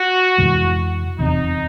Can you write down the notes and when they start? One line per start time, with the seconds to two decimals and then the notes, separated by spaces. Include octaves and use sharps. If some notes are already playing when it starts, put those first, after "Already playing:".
Already playing: F#4
0.38 F2 C3 E3 G#3
1.19 F1 E2 C3 D#4